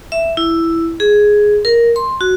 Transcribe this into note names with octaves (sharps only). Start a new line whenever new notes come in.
E5
E4
G#4
A#4
C6
F#4